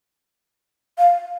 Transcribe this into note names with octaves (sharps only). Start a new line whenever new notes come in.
F5